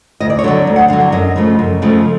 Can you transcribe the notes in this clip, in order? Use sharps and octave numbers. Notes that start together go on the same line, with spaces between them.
D2 D#5
D5
C#5
D3 F#3 D5
D2
F#5
D3 F#3 F5
E5
F#2 D#5
C#3 F3 A3
F#2
C#3 F3 A3